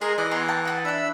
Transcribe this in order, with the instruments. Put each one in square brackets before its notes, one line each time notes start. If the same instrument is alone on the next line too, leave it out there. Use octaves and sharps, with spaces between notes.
[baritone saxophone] G#3 [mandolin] G#4 A#5 [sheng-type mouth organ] A#4 D#5 C6
[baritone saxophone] E3 [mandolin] D5 [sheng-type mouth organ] D#5
[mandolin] B3 G#4 C6 [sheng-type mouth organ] A#5
[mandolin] A#3 G5 A5
[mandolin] D#5 G5 A5 [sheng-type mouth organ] F#5
[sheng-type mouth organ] D4 B5 E6 [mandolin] E5 F#6